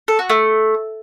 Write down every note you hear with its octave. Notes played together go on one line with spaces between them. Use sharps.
A4
F#4
A3